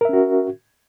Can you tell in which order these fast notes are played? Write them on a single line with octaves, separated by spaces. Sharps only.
A#4 E5 C#4 F#4